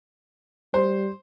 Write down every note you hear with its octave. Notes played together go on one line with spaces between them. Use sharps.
G3 C5